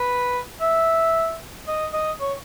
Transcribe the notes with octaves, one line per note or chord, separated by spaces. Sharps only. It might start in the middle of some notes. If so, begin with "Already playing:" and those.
Already playing: B4
E5
D#5
D#5
C#5